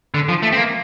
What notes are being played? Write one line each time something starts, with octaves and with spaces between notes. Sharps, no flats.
D3
F3
A3
C4
A#3